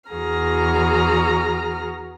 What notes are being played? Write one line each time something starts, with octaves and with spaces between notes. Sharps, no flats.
E2 F#4 G#4 A#5 F6